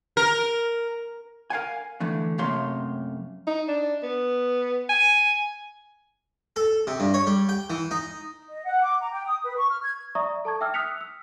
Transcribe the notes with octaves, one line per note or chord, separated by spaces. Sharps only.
A#4
A#4 F5 F#5 G#5
D3 E3 A3
F#2 C3 A3 A#3 C#5 C6
D#4
D4
B3
G#5
A4
C3
G2
C#5
G3
G5
E3
D#4
D#5
F#5
D6
A#5
G5
D#6
B4
C#6
F6
G#6
D5 E5 A#5 C#6 D#6
A4 A5 C#6 G#6
E5 G5 D6 E6 F6
D#6 F6 F#6 B6 C#7 F7
E6